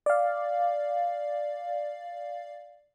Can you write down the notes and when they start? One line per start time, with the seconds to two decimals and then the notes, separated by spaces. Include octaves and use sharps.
0.06 D5 F5